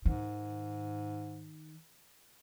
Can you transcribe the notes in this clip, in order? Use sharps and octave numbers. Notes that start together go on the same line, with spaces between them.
G#2 D#3